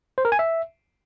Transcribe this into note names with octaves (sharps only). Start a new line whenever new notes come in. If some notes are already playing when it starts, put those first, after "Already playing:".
C5
A#4
G#5
E5